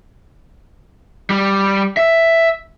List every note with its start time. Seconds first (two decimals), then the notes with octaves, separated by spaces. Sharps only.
1.30 G3
1.97 E5